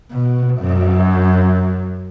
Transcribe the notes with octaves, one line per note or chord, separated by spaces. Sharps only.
B2
F#2